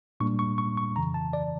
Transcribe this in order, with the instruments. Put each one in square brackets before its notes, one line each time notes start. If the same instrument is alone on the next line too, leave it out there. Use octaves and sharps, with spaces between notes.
[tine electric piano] A#2 G3 A#3 D4 C#6
C#6
C#6
C#6
F2 C#3 E3 A#5
A5
D5